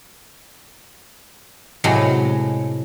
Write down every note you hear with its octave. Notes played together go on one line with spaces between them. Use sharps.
A2 C3 F#3 G#3